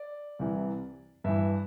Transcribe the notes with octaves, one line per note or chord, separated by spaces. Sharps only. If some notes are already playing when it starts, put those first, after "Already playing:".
Already playing: D5
C2 C3 E3
G2 E3 E5